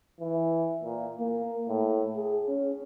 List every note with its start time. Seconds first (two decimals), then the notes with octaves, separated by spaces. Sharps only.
0.20 E3
0.84 A#2
1.20 A#3
1.68 A2
2.17 G#4
2.48 C#4